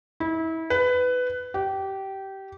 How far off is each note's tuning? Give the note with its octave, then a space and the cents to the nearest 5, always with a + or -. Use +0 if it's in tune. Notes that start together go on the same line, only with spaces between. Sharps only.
E4 -30
B4 +15
G4 -20